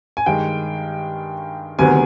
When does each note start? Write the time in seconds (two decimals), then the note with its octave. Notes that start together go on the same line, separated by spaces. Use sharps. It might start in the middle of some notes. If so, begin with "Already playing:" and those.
0.17 G#5
0.26 G2 D#3 G#3 G5
1.79 D2 C3 D#3 F#3 B3 G#5